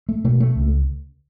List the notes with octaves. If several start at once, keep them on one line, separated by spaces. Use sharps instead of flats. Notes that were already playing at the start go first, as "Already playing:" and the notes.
A3
B2 A3
A3
C#2